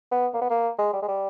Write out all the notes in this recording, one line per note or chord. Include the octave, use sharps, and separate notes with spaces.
B3
A#3
B3
A#3
G#3
G3
G#3
G3